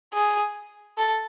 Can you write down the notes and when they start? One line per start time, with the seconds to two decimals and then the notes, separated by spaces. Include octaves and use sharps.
0.14 G#4
0.98 A4